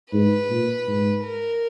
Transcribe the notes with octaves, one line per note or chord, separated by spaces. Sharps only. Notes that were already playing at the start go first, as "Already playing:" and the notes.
G#2 B4
A#2
G#2
A#4